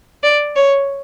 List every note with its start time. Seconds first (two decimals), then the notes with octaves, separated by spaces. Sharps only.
0.23 D5
0.55 C#5